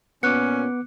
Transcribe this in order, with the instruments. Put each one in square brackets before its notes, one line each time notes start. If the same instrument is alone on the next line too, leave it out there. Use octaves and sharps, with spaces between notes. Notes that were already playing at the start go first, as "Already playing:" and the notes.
[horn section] A#2 C#4 [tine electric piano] B3 D6 [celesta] F#6 C#7